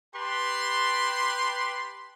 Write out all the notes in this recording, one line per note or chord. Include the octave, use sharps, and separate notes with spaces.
G4 B4 A5 C6